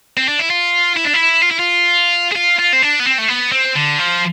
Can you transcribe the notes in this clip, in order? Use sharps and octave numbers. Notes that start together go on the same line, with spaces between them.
C4
D4
E4
F4
E4
D4
E4
F4
E4
F4
G#4
F4
F4
C4
D4
B3
C4
A3
B3
C4
D3
F3